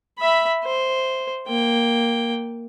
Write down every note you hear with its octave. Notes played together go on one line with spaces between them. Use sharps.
E5 B5
C5
A#3 G5